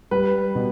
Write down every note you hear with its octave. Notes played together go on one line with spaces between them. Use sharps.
G3 B4
B2